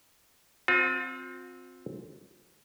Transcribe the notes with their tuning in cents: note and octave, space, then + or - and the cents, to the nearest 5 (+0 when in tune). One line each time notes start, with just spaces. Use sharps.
C4 +0 F4 +40